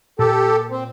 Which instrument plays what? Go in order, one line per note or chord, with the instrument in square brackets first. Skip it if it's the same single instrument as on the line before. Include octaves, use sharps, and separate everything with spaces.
[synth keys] A#2 [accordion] G4 A4
[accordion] C4